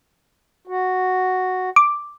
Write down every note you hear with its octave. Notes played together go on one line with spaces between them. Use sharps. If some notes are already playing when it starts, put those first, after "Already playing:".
F#4
D6